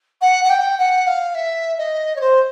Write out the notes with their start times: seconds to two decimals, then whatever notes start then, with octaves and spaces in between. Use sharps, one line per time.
0.21 F#5
0.44 F#5
0.49 G5
0.78 F#5
1.06 F5
1.34 E5
1.78 D#5
2.16 C#5
2.20 C5